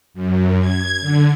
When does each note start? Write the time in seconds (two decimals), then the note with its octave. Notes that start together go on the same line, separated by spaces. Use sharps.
0.14 F#2
0.60 G#6
1.01 D3